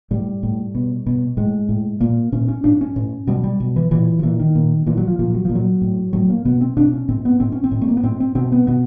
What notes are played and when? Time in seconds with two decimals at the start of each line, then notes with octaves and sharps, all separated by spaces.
0.11 A2 G3
0.43 A2
0.75 B2
1.06 B2
1.37 A2 G#3
1.69 A2
2.00 A#2 A#3
2.32 A#2 C#4
2.48 C#4
2.64 A2 D4
2.81 C#4
2.96 A2
3.27 B2 G3
3.44 G3
3.60 B2
3.76 E3
3.91 A#2 E3
4.19 F3
4.23 A#2 E3
4.39 D#3
4.55 A#2
4.86 A#2 E3
4.97 F#3
5.08 F3
5.19 A#2 F3
5.34 F#3
5.45 A#2 F3
5.55 F#3
5.82 A2
6.13 A2 F#3
6.30 A#3
6.45 B2 B3
6.61 C4
6.77 B2 D4
6.93 C#4
7.08 A2 C4
7.25 B3
7.40 A2 C4
7.52 C#4
7.64 C4
7.72 A2
7.81 A3
7.88 A#3
7.97 B3
8.03 A2 C4
8.20 C4
8.35 B2 C4
8.52 B3
8.67 B2 B3